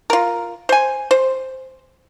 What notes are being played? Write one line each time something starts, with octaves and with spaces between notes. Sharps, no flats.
F4 A#4
C5 G#5
C5